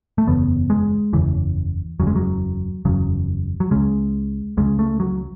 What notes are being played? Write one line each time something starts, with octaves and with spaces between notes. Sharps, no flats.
A3
F#1 E2 C#3 B3
G#3
F#1 E2 C#3 E3
F#1 E2 C#3 F#3
G#3
F#3
F#1 E2 C#3 F#3
F#3
C#2 C#3 G#3
C#2 C#3 G#3
A3
F#3